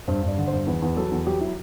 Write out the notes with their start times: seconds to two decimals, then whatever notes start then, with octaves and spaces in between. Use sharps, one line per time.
0.08 G2 C5
0.23 G2
0.28 D5
0.37 D3
0.48 G2 C5
0.67 E2 B4
0.82 E2
0.97 F#3 A4
1.11 E2
1.27 F#3 G4
1.41 E4